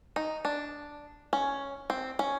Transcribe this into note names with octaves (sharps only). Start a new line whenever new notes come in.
D#4
D4
C#4
C4
C#4